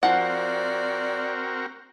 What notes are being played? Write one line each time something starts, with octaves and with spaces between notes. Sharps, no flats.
F3 C4 F#4 A#4 D5 F#5